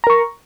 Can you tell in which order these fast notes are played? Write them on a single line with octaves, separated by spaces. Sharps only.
A#5 A#4 C#6